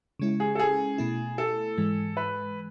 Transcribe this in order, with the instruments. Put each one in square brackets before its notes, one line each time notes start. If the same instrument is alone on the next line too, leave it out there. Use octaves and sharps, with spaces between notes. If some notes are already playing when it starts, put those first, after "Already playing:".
[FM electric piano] C#3 G#3 C#4 E4
[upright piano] G#4
A4
G#4
[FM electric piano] B2 A3 E4
[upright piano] A4
[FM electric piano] G#2 E3 G#3
[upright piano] B4